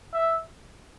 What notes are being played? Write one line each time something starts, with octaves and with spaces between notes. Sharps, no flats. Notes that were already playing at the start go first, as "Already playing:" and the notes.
E5